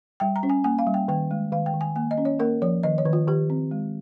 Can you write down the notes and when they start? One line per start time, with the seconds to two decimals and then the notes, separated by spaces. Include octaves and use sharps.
0.20 G3 G5
0.36 A#5
0.43 C#4
0.49 G#5
0.64 A#3 G#5
0.79 F5
0.87 G3
0.94 G5
1.08 D#3 G5
1.31 G#3
1.52 D#3 F5
1.66 G5
1.74 D#3
1.81 G#5
1.96 A#3 G#5
2.11 D#5
2.18 C#4
2.25 C#5
2.39 A#3 A#4
2.62 F3 C#5
2.83 D#3 D#5
2.98 C#5
3.05 D#3
3.13 F4
3.28 D#3 G4
3.50 C4
3.71 G#3